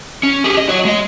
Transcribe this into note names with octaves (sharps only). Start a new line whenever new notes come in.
C#4
G4 G#4
D#5
F#4 C#5
G#3 D#5